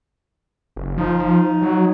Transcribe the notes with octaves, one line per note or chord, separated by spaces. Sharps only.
F#1
F3 D#4
F#3